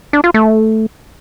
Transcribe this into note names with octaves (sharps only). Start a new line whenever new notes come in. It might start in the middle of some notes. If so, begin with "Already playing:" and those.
D4
F4
A3